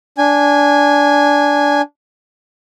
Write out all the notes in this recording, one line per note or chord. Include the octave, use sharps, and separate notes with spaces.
D4 G#5